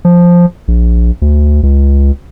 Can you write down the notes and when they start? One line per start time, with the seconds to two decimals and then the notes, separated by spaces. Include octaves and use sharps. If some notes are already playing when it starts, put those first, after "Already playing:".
0.05 F3
0.68 A#1
1.22 D2
1.63 C#2